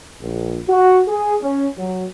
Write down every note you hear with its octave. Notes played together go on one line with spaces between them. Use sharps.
A#1
F#4
G#4
C#4
F#3